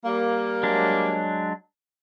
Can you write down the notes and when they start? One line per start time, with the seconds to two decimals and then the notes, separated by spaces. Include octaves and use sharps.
0.05 G3 A#3
0.63 F#3 G#3 D4